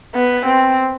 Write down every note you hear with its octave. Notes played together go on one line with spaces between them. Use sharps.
B3
C4